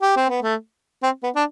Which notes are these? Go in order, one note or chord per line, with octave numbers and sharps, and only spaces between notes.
G4
C4
B3
A3
C4
B3
D4